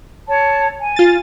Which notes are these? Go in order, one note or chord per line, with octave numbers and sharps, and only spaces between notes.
C#5 A5
G#5
F4 A6